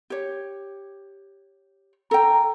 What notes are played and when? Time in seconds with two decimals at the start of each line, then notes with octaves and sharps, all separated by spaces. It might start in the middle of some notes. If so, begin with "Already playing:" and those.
0.10 G4 C#5
2.11 A4 G5 A#5